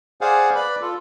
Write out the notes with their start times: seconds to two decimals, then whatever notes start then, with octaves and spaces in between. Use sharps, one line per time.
0.21 G#4 C5 D5 F5 F#5 G#5
0.55 B4 D5 B5
0.81 F4 A4